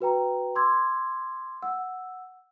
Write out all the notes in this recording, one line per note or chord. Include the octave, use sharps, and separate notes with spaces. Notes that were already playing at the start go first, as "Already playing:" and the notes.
F#4 B4 G5 A#5
C6 D6 E6 G#6
F#5 E6